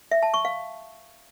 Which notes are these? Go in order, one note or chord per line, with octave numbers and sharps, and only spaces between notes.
E5
A5
C#6
F5